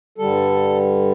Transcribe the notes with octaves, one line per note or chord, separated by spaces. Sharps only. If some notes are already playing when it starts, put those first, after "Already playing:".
G2 D3 G3 A4